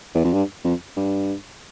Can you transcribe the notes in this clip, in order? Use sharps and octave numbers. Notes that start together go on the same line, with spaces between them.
E2
F2
G2
F2
G2